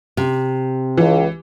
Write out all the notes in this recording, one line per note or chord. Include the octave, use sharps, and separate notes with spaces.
C3
C#2 E3